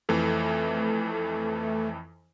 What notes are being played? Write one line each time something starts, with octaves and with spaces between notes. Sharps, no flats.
F2 E3 A3